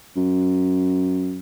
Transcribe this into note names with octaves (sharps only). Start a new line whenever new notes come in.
F#2